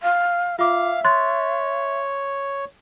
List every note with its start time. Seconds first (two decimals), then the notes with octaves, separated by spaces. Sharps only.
0.03 F5
0.59 F4 E5 F5 D6
1.04 C#5 C6 F#6 A6